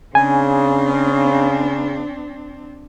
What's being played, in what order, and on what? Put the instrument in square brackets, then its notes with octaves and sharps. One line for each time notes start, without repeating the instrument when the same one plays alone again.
[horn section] C#3 [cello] C4 D4 [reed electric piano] G#5